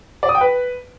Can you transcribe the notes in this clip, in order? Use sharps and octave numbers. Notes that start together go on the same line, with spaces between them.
D5
D#6
G5
B4